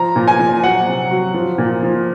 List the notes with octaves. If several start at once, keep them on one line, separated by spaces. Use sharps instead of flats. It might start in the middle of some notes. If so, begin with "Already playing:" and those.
Already playing: F3 A#5
A#2
G#5
F3
F#3 F#5
C3
F#3
F3
A#2
F3